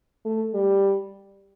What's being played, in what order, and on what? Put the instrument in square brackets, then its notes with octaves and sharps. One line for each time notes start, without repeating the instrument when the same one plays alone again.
[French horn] A3
G3